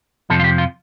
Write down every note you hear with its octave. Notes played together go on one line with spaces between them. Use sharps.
F2 C3 F3 A4
F4
G4
F4